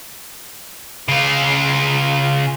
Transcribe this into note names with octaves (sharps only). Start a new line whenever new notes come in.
C#3 F4